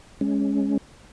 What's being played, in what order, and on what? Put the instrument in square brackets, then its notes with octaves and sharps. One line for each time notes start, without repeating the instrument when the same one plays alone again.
[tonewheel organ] G#3 C#4